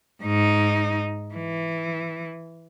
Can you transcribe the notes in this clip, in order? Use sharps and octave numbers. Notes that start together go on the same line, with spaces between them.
G#2 D#4
E3